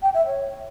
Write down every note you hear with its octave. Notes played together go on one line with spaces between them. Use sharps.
G5
E5
C#5